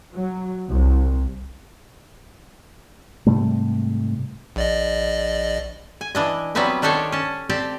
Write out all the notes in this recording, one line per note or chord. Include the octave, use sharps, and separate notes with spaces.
F#3
C2
G#2 C3 G3 A3
A#1 D5 D#5
G#5
E3 D4 D#5
F#3 G3 B3 C4 B4 E5
D#3 D4 G4 A4 C5 C#5
C#4 A5
C4 G4 D5 A5